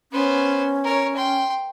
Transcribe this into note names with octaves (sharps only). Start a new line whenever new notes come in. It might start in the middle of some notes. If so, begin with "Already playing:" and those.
B3 C#4 C5
A#4 C#5
G5 C6